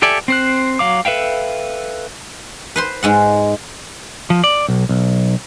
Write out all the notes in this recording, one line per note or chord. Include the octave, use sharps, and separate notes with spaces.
G4 A4 D5 E5 G#5
C4 C5 F#6
F#3 F5 D6
A4 B4 E5 F5 G5
B4 C5 C6
G#2 G#3 F#5
F3
D5
B1
B1